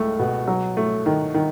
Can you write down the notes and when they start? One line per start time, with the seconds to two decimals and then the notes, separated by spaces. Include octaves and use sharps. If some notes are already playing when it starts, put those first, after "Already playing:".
Already playing: C#2 A3
0.19 B2
0.48 F#3
0.77 A3
1.06 D#3
1.34 D#3